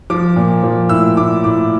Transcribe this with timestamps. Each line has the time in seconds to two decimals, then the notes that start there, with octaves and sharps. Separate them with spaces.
0.10 F3 D6
0.36 A#2
0.63 F3
0.89 A2 E6
1.17 A2 D6
1.44 A2 D6